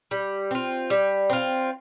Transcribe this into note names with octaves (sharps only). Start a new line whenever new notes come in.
G3
C4 F4
G3
C4 F4